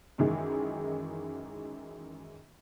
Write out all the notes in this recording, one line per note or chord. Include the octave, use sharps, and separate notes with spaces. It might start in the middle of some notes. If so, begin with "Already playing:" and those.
F#2 D#3 E3 G#3